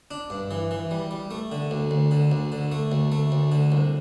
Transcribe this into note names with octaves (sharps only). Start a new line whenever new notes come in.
D4
G2
E3
E3
G3
G3
A3
D3
D2
D2
D3
D2
D3
A3
D2
A3
D2
D3
C2